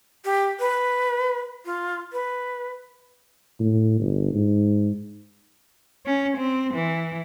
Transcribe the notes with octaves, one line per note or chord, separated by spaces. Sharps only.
G4
B4
F4
B4
A2
G1
G#2
C#4
C4
E3